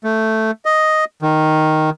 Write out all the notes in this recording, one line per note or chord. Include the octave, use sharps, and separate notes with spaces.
A3
D#5
D#3